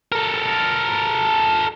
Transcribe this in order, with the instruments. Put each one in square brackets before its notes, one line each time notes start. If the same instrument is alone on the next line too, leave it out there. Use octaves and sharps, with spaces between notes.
[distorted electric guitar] A4 A#4